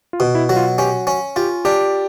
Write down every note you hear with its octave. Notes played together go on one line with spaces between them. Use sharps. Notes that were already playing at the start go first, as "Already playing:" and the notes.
F4
B2
E4
F#3
F4
C#4 G4
C#4
F4 G4
D4 G4